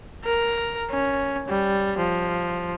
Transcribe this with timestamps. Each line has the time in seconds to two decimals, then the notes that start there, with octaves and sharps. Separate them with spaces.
0.25 A#4
0.90 C#4
1.48 G3
1.98 F3